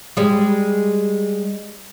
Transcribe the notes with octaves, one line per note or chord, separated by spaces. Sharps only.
G3 G#3